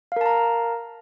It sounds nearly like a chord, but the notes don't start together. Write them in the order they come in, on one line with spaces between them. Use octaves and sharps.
F5 A#4 A5 A#5